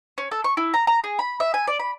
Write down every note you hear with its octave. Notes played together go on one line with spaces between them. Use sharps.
C#4
A4
C#6
E4
A#5
A#5
G#4
B5
E5
G#5
D5
B5